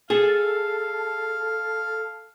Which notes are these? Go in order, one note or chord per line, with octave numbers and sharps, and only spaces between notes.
G#4 A4 F5